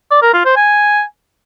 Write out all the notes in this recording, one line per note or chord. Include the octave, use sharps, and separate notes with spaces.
D5
A#4
F4
C5
G#5